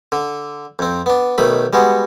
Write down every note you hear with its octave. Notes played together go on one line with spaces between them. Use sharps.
D3
F2 C4
B3 D4
B1 D#3 A3 B5
G3 G#3 B3 F#4